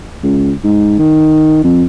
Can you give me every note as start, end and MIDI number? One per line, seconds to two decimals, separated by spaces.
0.23 0.52 37
0.64 0.94 44
0.99 1.60 51
1.64 1.84 41